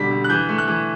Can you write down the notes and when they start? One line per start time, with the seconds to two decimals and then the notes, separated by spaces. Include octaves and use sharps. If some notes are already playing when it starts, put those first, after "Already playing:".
Already playing: B2 D3 G3 B6
0.11 D3
0.24 F#6
0.30 E3 G6
0.49 A3
0.58 F#6
0.68 E3